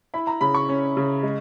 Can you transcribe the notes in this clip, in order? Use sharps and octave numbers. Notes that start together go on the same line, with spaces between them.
E4 B5
A#5
C#3 B5
C#6
C#4
C#3
G#3